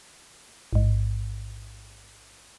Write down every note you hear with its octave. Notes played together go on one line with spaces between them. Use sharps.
A1 G#2